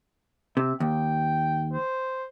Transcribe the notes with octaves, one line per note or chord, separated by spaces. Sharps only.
C3 E5
D#2 G5
C5